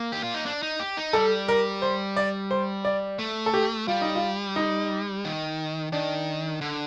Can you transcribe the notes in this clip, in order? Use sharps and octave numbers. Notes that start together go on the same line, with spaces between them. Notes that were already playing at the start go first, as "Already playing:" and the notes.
Already playing: A#3
G4
F4
D#4
D4
D#4
G4
D#4
G3 A4
A#4
C5
D5
C5
D5
A3
A4
G4
G3 F4
D#4
F4
D#4
D#3
D#3 D4
D3